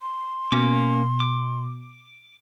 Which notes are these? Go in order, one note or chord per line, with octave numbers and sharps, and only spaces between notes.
C6
B2 A#3 C#4 D6
D6